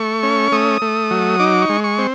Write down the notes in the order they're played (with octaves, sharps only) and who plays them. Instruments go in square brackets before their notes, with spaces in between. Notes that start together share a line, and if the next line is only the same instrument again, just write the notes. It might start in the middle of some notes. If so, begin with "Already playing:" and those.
Already playing: [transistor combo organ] A3 C#6
C#4
A3 D#6
A3
F#3
D#4 D6
C#6
G#3
C#6
C4